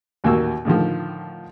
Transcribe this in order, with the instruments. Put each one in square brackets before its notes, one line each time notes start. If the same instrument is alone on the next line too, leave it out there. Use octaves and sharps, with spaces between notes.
[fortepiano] A1 D#2 A#2 A#3 F#4 E6
A2 D3 D#3 F3